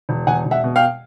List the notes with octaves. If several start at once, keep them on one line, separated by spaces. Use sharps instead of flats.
E1
E1 F#5 G#5
E1
E5 F#5
B2
F5 G5